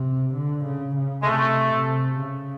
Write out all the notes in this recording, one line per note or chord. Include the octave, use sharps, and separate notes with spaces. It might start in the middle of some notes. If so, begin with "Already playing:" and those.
Already playing: C3
D3
C#3
C#3
G#3
C3 A3
C3
C#3